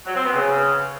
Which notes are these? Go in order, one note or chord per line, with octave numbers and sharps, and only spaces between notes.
F#3
C4
B3
C#3